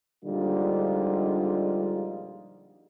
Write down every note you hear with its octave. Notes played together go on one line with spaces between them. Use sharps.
A#1 D3 G3 G#3 D#4 F4